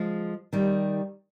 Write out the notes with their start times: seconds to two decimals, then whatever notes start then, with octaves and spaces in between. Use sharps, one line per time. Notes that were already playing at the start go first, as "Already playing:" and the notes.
Already playing: F3 G#3
0.53 D#3 G3